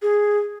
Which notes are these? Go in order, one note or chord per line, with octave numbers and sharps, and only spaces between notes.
G#4